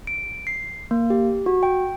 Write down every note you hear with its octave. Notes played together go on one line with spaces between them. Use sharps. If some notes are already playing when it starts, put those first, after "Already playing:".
D7
C7
A#3
G4
F#4
G5